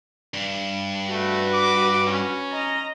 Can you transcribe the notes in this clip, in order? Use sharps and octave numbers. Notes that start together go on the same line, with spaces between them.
G2
A3 F#4 B4
D6
C#4
D#5 A#5